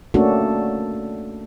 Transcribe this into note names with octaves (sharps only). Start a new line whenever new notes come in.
A3 A#3 C#4 D4 F#4 A4